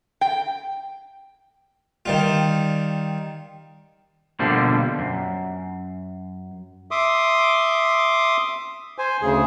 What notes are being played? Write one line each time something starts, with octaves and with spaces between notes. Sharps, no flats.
G5
D#3 G3 F4
B2 D3 F3 G3 A#3
F#2
E5 C6 D6 D#6
C5 G#5
D2 C#3 G#4